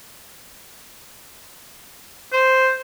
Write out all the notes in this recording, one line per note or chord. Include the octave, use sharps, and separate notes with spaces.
C5